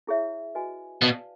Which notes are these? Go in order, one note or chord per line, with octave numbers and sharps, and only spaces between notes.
E4 G#4 C#5 E5
F#4 B4 D#5 G#5
B2 B4 D5 F5 A5